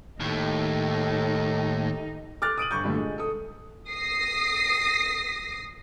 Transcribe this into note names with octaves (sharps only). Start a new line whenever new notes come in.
D#2 A2 D#4 G4 A4
D6 F6 F#6 A6
D#6 D7 D#7 F#7
G1 C#6 G6
G2 A#2 D3 A3
G#3
A4 D#6
D#6 A#6 C7